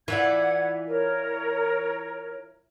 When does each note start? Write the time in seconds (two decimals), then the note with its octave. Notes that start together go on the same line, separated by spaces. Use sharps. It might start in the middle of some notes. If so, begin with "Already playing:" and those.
0.08 E3 F4 B4 D5 F#5 G#6
0.87 A#4 C#5